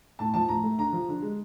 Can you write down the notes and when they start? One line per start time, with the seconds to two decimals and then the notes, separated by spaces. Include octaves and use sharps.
0.19 A2 A5
0.34 F3 A5
0.48 A2 A#5
0.63 A3
0.78 D3 A#5
0.93 F3
1.08 D3
1.22 G#3